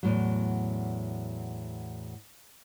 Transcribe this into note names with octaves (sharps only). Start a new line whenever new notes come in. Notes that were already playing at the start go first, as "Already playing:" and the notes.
E2 A2 F#3